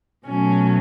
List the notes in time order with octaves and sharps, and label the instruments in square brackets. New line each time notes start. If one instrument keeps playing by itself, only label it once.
[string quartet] B2 F#3 A3 C#4